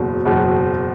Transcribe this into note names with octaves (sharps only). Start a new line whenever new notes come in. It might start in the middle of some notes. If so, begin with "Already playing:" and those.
Already playing: F#1 E2 B2 F#3
F#1 E2 B2 F#3